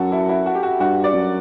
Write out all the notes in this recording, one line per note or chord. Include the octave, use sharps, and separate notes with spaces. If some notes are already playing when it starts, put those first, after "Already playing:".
Already playing: F#2 F#4 A4
E4
E4
F#4
G4
F#4
G2 F#4
D5
F#2